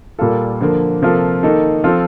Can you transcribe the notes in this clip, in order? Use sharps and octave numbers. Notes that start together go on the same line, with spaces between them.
A#2 G3 A#3 F4 A4
D3 F3 A#3
C3 F3 A#3 F4 A4
D#3 A#3 D#4 A4
F3 C4 F4 A4